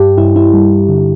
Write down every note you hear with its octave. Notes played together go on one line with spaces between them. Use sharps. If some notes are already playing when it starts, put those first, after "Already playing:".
Already playing: G2 G4
G2 E4
E4
G3
D3